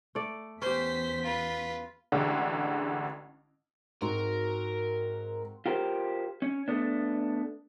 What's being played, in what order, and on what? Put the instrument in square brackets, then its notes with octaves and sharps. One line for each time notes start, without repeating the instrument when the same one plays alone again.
[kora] A3 A4 D5
[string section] E2 B6 [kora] C#4 G4 [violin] C5
[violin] F4 B4
[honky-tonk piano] A1 D3 G#3
[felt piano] G#2 [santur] C4 F#4 [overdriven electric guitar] A#4
[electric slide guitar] F4 G4 A#4 C5
C#4
A3 B3 D4